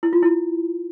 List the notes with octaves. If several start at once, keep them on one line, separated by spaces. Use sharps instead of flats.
E4
F4
E4